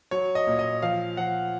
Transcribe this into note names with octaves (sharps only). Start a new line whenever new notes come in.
F#3 C#5
D#5
A#2
D#5
F3 F5
F3 F#5